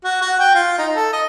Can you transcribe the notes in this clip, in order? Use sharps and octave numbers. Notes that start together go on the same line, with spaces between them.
F#4
F#4
G5
F4
D#4
A4
D#5